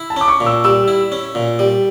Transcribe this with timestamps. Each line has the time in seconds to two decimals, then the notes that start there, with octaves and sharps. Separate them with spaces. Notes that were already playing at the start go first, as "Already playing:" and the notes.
Already playing: E4
0.10 A5
0.16 C#4 D6
0.28 C#6
0.40 A#2
0.46 E6
0.64 G3 E6
0.88 E4
1.12 C#4
1.35 A#2
1.59 G3